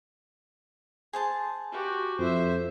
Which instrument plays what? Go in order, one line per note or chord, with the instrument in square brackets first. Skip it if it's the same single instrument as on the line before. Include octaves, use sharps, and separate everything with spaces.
[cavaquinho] G#4 C5 A5
[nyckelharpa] F#4 G4
[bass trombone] F2 [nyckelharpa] C5 E5